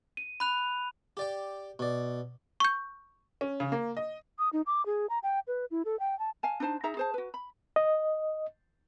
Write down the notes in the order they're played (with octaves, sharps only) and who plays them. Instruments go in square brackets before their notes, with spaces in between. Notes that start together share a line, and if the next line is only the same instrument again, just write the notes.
[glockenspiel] D#7
B5 F#6 F7
[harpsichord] G4 D5 G5
B2 D5
[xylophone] C#6 G6
[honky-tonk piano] C#4
C#3
A#3
D#5
[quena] D#6
D#4
D6
G#4
A#5
G5
B4
E4
A4
G5
A5
[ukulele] F5 G#5 A5
D4 D#4 C5 A5
D#4 G#4 E5 A#5
G#4 C5 A5
F#4 B4
B5
[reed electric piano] D#5